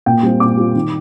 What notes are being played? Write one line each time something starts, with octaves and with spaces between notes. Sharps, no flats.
A#2 G5
G3 C4 F4
A#2 D6
G3 C4 F4
D#3